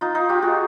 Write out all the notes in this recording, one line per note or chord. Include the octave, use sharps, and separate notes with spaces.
D#4 F4
D#4 F4
F4 G4
F#4 G#4